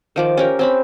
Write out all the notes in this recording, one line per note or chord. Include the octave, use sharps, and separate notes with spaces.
D#3 F3 D5
C#4 G4 A#4
C4 C#4 B5